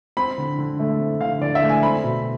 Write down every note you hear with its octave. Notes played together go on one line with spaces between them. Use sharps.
C4 B5
D3
D3
A3
C4
D3 F5
D3 D5
E5
A3
G#5
C4 B5
B2